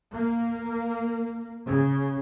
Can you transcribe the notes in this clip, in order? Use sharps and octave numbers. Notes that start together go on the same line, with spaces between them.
A#3
C#3